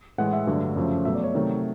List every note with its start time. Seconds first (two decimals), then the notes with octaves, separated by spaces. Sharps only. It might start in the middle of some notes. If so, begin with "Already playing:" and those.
0.18 A2 E3 G#3 F#5
0.33 E5
0.47 G2 D3 F#3 A3 E5
0.76 F#2 C#3 F3 A3
1.05 B2 F#3 A3 E5
1.15 D5
1.24 C#5
1.34 C3 D#3 F#3 A3